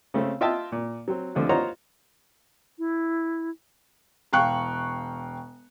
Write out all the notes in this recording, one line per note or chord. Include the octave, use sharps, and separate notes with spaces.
C#3 A3 C4
F4 D#5 E5 G5 A5
A#2
F#3 C4
D#2 D3 F3 A3
F4 C5 C#5 D#5 F#5 A#5
E4
E1 F5 G5 C#6 F#6